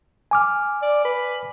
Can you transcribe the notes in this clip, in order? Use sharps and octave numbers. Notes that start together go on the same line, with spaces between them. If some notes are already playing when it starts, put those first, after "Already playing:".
G#5 D6 F6
D5
B4